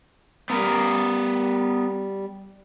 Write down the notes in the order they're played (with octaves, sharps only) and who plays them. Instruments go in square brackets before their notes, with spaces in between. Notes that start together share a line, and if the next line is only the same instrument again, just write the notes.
[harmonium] G3 [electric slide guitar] B3 A#4